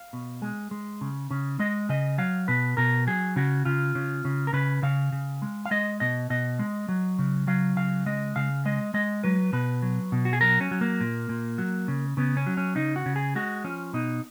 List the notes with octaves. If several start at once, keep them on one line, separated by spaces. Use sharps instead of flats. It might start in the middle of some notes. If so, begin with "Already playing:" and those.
Already playing: F5
B2
G#3
G#3
C#3
C#3
G#3 D#5
C#3 D#5
F#3 F5
B2 B4
B2 A#4
F#3 G#4
C#3 F#4
C#3 F4
C#3
C#3
A#4
C#3 B4
C#3 F5
C#3
G#3
F5
G#3 D#5
B2 D#5
B2 D#5
G#3
F#3
C#3
F#3 F5
C#3 F5
G#3 D#5
C#3 F5
G#3 D#5
G#3 D#5
F#3 B4
B2 B4
F#3
B2
F#4
G#4
F#3 A#4
C#4
F#3
A#3
A#2
A#2
F#3
C#3
C#3 B3
C#4
F#3
C#4
C#3 D#4
F#4
C#3
G#4
G#3 F#4
F3 C#4
B2 D#4